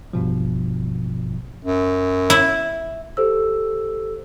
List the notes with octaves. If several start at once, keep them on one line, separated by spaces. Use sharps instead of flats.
A1 G2 B2 F3
F#2
E4
G4 A4 C5 E6